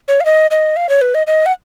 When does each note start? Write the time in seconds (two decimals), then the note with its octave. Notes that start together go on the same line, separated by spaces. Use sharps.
0.08 C#5
0.20 F5
0.25 D#5
0.51 D#5
0.76 F5
0.89 C#5
1.01 B4
1.15 D#5
1.27 D#5
1.46 F#5